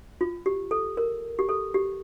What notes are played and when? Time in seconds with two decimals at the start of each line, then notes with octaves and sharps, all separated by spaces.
0.21 F4
0.46 G4
0.71 A4
0.97 A#4
1.39 G4
1.49 A4
1.74 G4